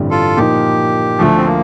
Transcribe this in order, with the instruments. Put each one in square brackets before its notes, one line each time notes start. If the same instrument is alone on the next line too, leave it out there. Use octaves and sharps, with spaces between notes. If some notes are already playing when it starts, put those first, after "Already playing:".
Already playing: [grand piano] A1 G2 D3 G3 C4
[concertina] F4 A4
[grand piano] A#2 F3 A#3 D#4 [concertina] G4
[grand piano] D2 D3 F3 [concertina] A3
[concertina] C4
A#3